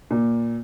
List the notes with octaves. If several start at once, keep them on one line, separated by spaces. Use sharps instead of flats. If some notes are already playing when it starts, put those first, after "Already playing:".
A#2